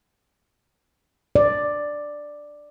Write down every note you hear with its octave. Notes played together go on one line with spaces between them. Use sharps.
D5